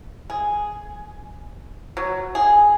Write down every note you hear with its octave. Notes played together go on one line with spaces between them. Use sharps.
G#4
F#3
G#4